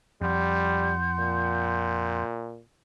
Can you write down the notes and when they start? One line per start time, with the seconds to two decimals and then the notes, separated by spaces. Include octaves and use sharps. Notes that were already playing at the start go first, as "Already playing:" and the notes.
0.21 F2 G3 F#5 C6 G6
1.19 A#2